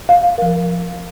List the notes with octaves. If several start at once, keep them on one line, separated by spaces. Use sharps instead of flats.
F5
F3 A#4